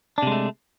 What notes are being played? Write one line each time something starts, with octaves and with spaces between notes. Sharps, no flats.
C3 G#3 A3 D4